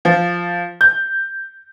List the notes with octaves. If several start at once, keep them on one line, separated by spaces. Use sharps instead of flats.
F3
G6